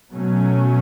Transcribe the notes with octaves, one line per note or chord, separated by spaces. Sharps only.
B2 F#3 A3 C#4